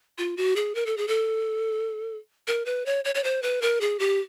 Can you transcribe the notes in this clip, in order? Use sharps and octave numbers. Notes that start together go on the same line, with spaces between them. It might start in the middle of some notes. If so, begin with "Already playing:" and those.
F4
F#4
G#4
A#4
A4
G#4
A4
A#4
B4
C#5
C#5
C#5
C5
B4
A#4
G#4
G4